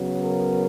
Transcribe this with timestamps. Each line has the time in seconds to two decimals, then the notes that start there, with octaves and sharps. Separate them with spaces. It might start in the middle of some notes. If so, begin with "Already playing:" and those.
Already playing: C#3 F#3 B3
0.23 A#4